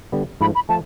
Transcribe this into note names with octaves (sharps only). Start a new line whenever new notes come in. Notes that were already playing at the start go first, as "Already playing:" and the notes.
D3 G3 B3
G#2 F3 A3 B5
B5
F3 A3 A5